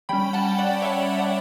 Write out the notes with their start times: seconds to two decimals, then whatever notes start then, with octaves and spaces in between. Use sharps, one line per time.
0.09 G3 C#4 G5 B5
0.33 F#5 A5
0.59 D5 F#5
0.82 C#5 E5
1.18 D5 F#5